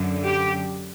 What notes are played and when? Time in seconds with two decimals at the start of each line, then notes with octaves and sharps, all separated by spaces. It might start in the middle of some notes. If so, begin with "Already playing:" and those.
Already playing: F#2 D3
0.26 G4